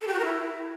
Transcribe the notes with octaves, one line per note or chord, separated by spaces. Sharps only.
A4
G4
F#4
A#4
E4